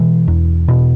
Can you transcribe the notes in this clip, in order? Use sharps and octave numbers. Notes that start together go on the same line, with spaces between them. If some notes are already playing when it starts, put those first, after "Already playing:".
Already playing: B2 E3
E2
B2